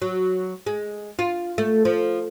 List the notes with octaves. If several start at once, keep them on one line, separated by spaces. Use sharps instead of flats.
F#3
G#3
F4
A3
F3